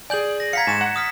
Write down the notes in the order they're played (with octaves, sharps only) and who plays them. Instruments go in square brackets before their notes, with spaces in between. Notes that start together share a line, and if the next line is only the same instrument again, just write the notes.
[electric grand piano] G#4 D5 [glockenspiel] G#5 G6 F#7
[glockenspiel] A#6
[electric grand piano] F5 F#5 A#5 [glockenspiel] G#6 B6 C#7
[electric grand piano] G#2 G#5 C#6 [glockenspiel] A#5 A6 E7
[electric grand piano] F#5
[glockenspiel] D#6 F6 B6